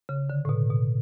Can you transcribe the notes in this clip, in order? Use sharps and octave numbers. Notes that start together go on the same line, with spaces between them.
C#3
D3
A2
B2
B2